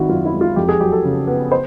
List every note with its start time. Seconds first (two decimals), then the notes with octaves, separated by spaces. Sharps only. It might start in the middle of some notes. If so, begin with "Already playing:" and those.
Already playing: G#1 D#3 E4 F#4
0.09 F#2 F4
0.26 E4
0.34 G#3
0.41 F4
0.56 F2 G4
0.69 G#4
0.80 F#3 G4
0.92 A4
1.05 C#3
1.27 B3
1.52 C5